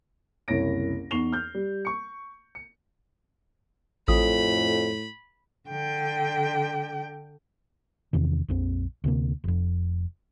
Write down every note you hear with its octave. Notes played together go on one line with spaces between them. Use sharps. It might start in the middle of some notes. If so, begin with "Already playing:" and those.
F#1 C2 E4 C#5 A#6 D7
E2 D#4 C#6 C7 F7 G7
F6 G6
G3
C#6 C#7
C#7
A1 F2 A2 B5 D#6
D3 G5
E2 C3 D#3
A#1 F2 C4
D2 C3 A#3
F1 F2